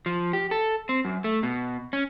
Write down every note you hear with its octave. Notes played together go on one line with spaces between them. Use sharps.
F3
G4
A4
C4
F#2
A3
B2
C#4